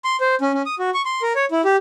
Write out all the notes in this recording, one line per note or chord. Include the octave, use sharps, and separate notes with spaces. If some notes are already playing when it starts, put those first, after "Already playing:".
C6
C5
C#4
C#4
D#6
F#4
C#6
C6
A#4
C#5
E4
G4